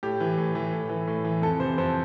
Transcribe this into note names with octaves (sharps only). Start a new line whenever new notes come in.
A2 G4
E3
A2
E3
A2
E3
A2
E3
F2 A4
C3 E3 C5
F2 C5